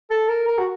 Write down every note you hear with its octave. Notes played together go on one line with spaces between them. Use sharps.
A4
A#4
A#4
F#4